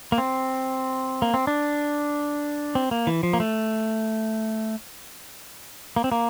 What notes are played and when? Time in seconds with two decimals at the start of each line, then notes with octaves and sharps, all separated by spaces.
0.12 A#3
0.18 C4
1.22 A#3
1.34 C4
1.47 D4
2.75 C4
2.91 A#3
3.07 E3
3.23 F3
3.33 A#3
3.40 A3
5.96 A#3
6.04 C4
6.12 A#3